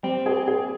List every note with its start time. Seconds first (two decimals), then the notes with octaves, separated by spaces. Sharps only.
0.03 G3 C4
0.26 G#4
0.48 G#4